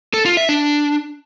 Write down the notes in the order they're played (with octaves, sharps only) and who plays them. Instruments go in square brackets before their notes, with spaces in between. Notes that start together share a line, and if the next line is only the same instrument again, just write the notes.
[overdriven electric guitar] A4
F4
E5
D4